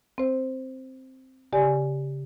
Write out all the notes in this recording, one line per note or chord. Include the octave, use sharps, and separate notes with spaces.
C4 C5
C#3 G4 D5 G#5